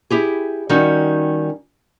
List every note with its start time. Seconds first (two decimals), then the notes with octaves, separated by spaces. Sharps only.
0.10 E4 G4 G#4
0.69 D#3 G3 C#4 D#4 F#4